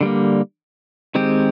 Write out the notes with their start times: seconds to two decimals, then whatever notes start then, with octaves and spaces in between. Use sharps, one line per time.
0.01 D3 G3 A#3
1.15 D#3 G#3 C4 G4